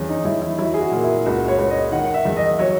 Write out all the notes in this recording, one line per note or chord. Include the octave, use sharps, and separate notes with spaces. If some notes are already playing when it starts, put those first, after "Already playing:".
Already playing: E2 C#4
D#4
E2 E4
E4
F#3 E4
G#4
F#4
A#2
E4
C#2 F#4
C#5
C#2
D#5
D#3 F#5
F#5
E5
E2
D#5
F#3 C#5